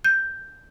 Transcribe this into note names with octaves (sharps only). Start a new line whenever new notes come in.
G6